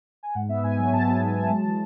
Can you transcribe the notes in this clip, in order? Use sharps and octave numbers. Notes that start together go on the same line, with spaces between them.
G#5
G#2 F#5
B3 E5
G#2 G#5
F#3 G#5
G#2 A5
B3
G#2 A5
F#3 G#5
A5
G#3
E3